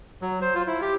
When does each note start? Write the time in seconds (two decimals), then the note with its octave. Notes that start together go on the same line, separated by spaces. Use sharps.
0.22 F#3
0.41 C5
0.55 F4
0.67 E4
0.82 G4